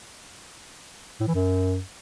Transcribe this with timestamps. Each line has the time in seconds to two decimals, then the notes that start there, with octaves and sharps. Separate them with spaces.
1.20 A2
1.28 E3
1.35 F#2